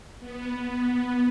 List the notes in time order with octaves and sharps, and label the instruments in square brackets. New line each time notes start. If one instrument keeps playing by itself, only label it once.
[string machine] B3